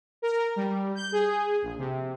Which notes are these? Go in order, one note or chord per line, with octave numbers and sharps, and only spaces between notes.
A#4
G3
G6
G#4
A#1
C3